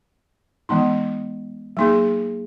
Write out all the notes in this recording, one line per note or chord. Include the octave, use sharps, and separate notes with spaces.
E3 G#3 B3 D#4
F#3 A#3 D#4 G#4